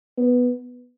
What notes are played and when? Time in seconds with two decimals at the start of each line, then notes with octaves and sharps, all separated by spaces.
0.18 B3